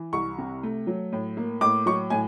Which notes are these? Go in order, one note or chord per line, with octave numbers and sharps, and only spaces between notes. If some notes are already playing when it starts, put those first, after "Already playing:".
Already playing: E3
C2 C#6
C3
A3
F#3
A2
A#3
A2 D6
F#3 C#6
A2 G#5